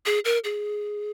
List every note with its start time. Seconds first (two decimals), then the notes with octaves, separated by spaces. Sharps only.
0.06 G#4
0.25 A#4
0.44 G#4